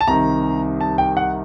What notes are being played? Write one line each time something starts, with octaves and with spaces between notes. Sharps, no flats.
A5
C2 C3 D#3 A#5
A5
G5
F#5